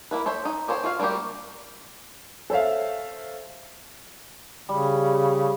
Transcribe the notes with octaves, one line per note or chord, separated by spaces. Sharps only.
A#3 E4 B4
A4 C5 C#5 E5
D#4
G4 A4 C5 C#5
F4 F#4 F5
G3 A3 A#3 F#4 G4
A4 C5 C#5 E5 F5
C#3 G3